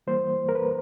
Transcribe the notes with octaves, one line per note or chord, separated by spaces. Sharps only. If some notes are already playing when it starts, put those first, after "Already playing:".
E3 G3 A#3 C5
A#4
B4